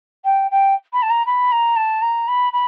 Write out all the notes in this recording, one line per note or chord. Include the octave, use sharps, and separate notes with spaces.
G5
G5
B5
A5
A#5
B5
A#5
A5
A#5
B5
B5